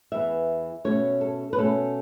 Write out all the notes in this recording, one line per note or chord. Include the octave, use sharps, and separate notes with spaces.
E2 E3 B3 E5
B2 A3 C#4 C#5
A4
B4
B2 A3 C#4 A4